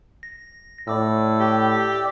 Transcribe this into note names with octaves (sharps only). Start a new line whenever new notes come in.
A#6
A2 D5 D6 E6
G4